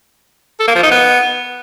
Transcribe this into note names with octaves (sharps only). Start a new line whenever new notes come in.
A4
A#3
F3
D#4
B3